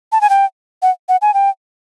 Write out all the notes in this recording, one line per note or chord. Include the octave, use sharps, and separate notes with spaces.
A5
G#5
G5
F#5
F#5
G#5
G5